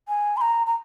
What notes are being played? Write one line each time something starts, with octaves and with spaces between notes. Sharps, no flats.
G#5
C6
A#5
A#5